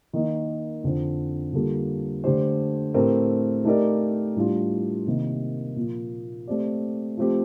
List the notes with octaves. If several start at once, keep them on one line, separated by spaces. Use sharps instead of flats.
D#3 A#3 D#4
F2 D3 F3 C4
D3 G3 A#3 F4 A4
D3 A3 D4 G4 C5
A2 A3 C4 G4 A#4
A3 D#4 G4 A#4 D5
A2 G3 D4 F4
C3 D#3 A#3
A#2 F3 A#3
A3 C4 G4 D5
F3 A3 C4 G4